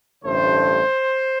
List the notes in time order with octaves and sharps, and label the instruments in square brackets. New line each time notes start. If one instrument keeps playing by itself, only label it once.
[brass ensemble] A1 G2 D3 A3 C5